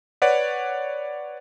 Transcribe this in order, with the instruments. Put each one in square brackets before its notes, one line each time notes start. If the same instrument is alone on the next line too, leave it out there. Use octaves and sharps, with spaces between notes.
[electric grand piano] B4 C#5 D5 F#5